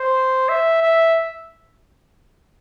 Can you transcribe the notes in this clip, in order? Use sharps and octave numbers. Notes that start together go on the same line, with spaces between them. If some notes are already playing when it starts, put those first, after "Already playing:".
Already playing: C5
E5
E5